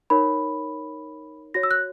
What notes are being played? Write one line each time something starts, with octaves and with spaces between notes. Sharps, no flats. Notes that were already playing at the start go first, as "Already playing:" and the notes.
D#4 A#4 C#5 B5
F#4 C#5 A#6
E6
F#6